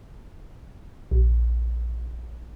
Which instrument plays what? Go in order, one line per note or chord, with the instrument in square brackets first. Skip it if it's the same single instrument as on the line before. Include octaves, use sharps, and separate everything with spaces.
[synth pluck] A#1